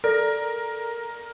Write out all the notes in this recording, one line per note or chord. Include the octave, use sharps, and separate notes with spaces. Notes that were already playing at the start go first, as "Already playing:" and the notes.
A4 A#4 D5 A#6